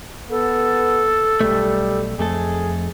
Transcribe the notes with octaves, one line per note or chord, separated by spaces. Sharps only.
B3 A4
B1 G3 A3
F2 A3 G#4 A4